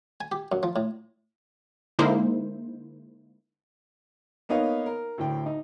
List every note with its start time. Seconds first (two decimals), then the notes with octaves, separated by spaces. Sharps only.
0.21 G#5
0.32 G4
0.52 F#2
0.63 F3
0.76 A2
1.99 D3 G#3 A#3 D#4 E4 C5
4.49 A#3 B3 D#4 C#5 F5
4.86 A#4
5.18 D2 A2 G5
5.46 D#4